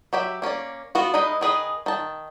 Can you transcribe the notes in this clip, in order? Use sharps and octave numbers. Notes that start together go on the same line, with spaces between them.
F#3 G4 E5
A#3 C#4 D4 D5
B3 F4 F#4
G#3 D#4 E4 B4 D#5
D#3 G#4 B4 D#5
D#3 A5